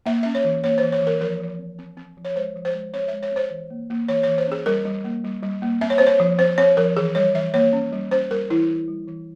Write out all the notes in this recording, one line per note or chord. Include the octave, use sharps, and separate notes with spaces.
A#3 E5
C#4 E5
C#5
E3
A#3 C#5
E3 C5
C#5
E3
A#4
F3 A#4
F3
C4
C4
C4
F3
C#5
G#3 C5
F3
C5
G#3
C4 C#5
G#3 E5
C#5
C4 C5
E3
A#3
A#3
E3 C#5
E3 C#5
C5
C#4 G#4
G3 A#4
G3
A#3
G3
G3
A#3
C4 E5
C#5
C4 C5
C#5
F3
C4 C5
C4 C#5
F3 A#4
E3 G#4
G3 C#5
E3 E5
A#3 C#5
C#4
G3
C#4 C5
G3 A#4
E3 E4
E3
G3
E3